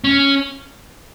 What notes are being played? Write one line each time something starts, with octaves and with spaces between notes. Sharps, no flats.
C#4